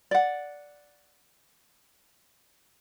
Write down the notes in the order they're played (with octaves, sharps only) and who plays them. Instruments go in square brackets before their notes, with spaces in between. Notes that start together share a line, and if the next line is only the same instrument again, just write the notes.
[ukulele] D5 F#5